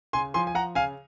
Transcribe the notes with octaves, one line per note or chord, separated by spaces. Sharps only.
C#3 G#5 C6
F3 G#5 C6
G#5
F3 F#5 A#5
C#3 F5 G#5